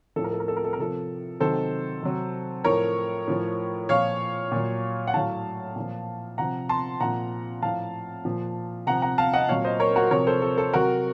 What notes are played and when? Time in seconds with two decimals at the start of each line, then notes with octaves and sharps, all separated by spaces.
0.16 A2 F3 A4
0.24 A#4
0.33 A4
0.40 A#4
0.48 A4
0.57 A#4
0.65 A4
0.73 A#4
0.79 C3 F3 A4
1.40 C3 D#3 F#3 A4 C5
2.03 C3 F#3
2.64 A2 F3 A#4 C#5
3.28 A2 F3
3.89 A#2 F3 C#5 F5
4.52 A#2 F#3
5.07 F#5
5.14 A2 F#3 F5 A5
5.76 A#2 F3
6.38 C3 F3 F#5 A#5
6.69 A5 C6
7.00 A#2 F3 F#5 A#5
7.62 A2 F3 F5 A5
8.25 A#2 F3
8.87 C3 F3 F#5 A#5
9.02 F#5 A#5
9.18 F5 A5
9.34 D#5 F#5
9.48 A#2 F#3 C#5 F5
9.65 C5 D#5
9.80 A#4 C#5
9.96 F#4 A#4
10.11 C3 F3 A#4 C#5
10.27 A4 C5
10.42 A4
10.58 A4
10.73 C3 F#3 F#4 A#4